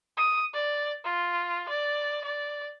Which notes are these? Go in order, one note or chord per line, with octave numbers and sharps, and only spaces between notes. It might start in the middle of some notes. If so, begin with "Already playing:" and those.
D#6
D5
F4
D5
D5